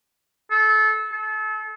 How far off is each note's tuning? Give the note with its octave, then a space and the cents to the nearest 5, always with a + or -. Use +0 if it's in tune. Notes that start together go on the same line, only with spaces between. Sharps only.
A4 -25
A4 -35